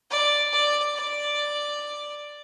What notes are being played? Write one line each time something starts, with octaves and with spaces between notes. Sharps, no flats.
D5
D5
D5